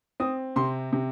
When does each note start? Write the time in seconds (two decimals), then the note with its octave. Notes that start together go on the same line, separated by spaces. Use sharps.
0.20 C4 D#6
0.56 C3 C6
0.93 C3